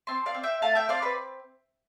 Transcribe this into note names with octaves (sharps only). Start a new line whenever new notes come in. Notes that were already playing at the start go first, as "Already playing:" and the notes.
C4 A5 C6
D5 F5
C4
E5 G5
A3 F5 A5
E5 G5
C4 D5 F5
B4 D5